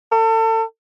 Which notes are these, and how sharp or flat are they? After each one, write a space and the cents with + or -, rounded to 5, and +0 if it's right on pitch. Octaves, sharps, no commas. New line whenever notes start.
A4 +35